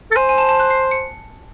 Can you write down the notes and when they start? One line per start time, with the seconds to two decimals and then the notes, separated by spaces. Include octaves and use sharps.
0.11 A4
0.16 C5 G#5
0.29 G#5
0.38 A5
0.49 A5
0.60 F#6
0.70 C7
0.91 C#7